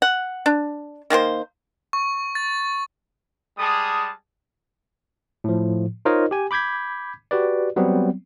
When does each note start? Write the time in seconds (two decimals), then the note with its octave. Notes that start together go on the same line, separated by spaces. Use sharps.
0.02 F#5
0.46 D4
1.10 D#3 A#3 G#4 C5
1.93 C#6
2.35 A6
3.58 G3 G#3 G#4 A5 D#6
5.44 A2 F3
6.05 D#4 F4 A#4 C5 C#5 D#5
6.31 G4 G#5
6.51 B5 D6 G6 G#6 B6
7.31 F#4 G4 B4 D5
7.76 F#3 G3 B3 C4